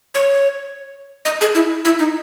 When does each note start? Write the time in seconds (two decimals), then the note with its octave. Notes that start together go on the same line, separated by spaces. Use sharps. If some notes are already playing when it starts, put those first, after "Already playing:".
0.15 C#5
1.25 D#5
1.41 G#4
1.55 E4
1.85 E4
1.99 D#4